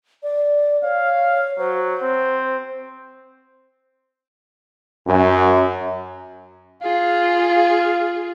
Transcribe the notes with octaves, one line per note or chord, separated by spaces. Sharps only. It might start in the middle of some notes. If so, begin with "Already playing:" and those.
D5
C#5 F5
F#3 C5
C4
F#2
F4 G#4 F5